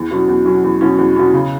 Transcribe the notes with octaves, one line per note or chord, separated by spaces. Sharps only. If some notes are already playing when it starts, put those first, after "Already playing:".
Already playing: E2
B2 F#3 C#4
E2
B2 F#3 C#4
E2
B2 F#3 C#4
E2
B2 F#3 C#4
C#3